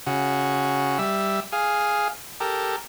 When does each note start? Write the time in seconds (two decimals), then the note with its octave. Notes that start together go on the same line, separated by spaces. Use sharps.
0.07 C#3 F#4
0.99 G3 E5
1.52 G#4 F5
2.40 G4 A4 A#4